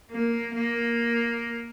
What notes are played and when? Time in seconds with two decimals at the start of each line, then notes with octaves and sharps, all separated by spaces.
0.12 A#3
0.55 A#3